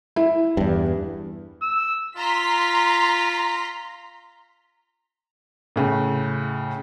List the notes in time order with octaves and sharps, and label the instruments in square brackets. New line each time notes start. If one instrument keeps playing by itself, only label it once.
[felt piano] E4
[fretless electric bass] E2 G2
[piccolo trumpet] E6
[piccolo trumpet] F4 [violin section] A#5 C6 B6
[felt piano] A2 C#3